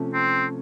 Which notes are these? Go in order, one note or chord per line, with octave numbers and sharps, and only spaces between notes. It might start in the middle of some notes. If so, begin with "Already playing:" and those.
Already playing: C3 F3 A3 C#4
C4